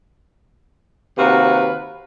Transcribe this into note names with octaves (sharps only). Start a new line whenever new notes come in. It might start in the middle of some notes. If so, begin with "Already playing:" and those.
D#2 C3 F#4 B4 F5